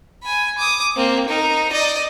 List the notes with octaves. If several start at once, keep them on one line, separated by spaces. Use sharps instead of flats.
G#5 B5
D6 D#6
A#3 C4
D#4 A#4
D5 D#5